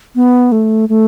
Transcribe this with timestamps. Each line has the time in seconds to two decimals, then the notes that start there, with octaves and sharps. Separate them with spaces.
0.16 B3
0.52 A3
0.89 A3